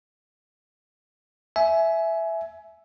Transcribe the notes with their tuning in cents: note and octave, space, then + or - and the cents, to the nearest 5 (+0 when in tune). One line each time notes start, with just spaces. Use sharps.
E5 +0 G#5 +20